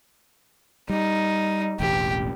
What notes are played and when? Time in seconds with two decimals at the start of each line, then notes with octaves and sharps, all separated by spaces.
0.90 G3 D#4
1.80 E1 A1 G4